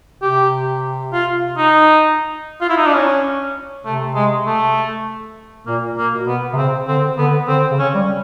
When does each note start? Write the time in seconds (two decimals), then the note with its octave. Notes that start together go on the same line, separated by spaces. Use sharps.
0.21 C3 G4
1.13 F4
1.57 D#4
2.61 F4
2.69 E4
2.77 D#4
2.86 D4
2.94 C#4
3.84 C3 A3
4.15 G#3
4.46 A3
5.66 A#2 A#3
5.97 A#3
6.12 B2
6.27 B3
6.53 C3
6.57 C#3 C4
6.87 D3 C4
7.18 D3 B3
7.48 D3 C4
7.71 C#3
7.79 C#4
7.94 G3